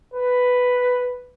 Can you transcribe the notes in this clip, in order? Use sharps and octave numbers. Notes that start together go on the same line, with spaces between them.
B4